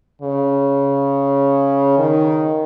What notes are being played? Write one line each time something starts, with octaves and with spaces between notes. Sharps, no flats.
C#3
D#3